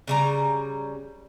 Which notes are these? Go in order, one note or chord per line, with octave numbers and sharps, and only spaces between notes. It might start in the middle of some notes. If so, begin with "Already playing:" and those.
C#3 G3 A#5